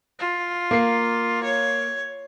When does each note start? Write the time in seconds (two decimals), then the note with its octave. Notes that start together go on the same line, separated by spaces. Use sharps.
0.19 F4
0.71 A#3 C7
1.43 C#5